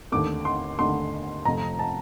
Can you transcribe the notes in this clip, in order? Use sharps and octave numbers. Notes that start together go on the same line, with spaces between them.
D#2 D3 A3 D6
C6
D#2 D3 A3 C6
F2 C3 F3 A3 A#5
A5